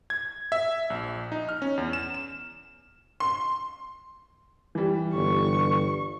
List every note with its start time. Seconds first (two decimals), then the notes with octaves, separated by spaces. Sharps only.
0.10 G#6
0.52 E5
0.90 A#1
1.32 D#4
1.49 F6
1.62 C#4
1.78 E2
1.93 E7
2.14 E7
3.20 C6
4.75 E3 G3
5.14 G1 C#6